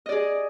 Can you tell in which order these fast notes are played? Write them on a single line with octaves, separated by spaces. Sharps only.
D#5 D5 G#4